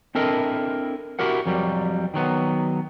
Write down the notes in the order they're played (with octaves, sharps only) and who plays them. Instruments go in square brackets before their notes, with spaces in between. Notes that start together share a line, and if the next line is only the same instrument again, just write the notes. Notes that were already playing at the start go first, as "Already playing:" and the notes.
[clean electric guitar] C4 D4 E4 A4 A#4 D#5
E4 F#4 G4 A#4 F#5
F2 F#3 G3
D#3 F#3 B3